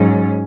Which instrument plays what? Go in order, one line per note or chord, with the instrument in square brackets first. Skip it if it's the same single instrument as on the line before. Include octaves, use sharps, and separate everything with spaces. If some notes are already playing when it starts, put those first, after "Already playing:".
Already playing: [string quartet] G#2 F#3 C#4